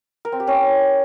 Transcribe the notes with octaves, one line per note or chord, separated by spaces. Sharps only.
A#4
C4
G4
C#4